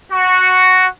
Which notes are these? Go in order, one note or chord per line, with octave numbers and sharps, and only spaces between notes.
F#4